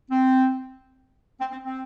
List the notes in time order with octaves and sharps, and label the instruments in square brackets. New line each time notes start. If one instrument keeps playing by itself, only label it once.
[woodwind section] C4
C4
C4
C4